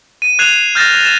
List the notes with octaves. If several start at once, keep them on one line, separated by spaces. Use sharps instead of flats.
D#7
F#6 G#6 C7 E7 F7
F6 G6 A6 A#6 E7
A6 E7